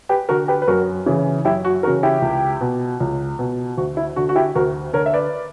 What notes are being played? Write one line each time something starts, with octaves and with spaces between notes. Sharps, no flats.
G4 B4
D3 F#4 A#4
G4 B4
B4
F#2 F#4 A#4
C#3 E3
F#2 E4 G4
F#4
C#3 E3 F#4 A#4
E4 G4
C#2
B2
C#2
B2
D2 F#4
E4
D3 F#4
F#4
E4 G4
D2 F#4 A#4
D3 A#4 C#5
E5
B4 D5